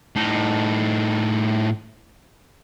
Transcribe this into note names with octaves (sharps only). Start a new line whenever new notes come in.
A2 D#4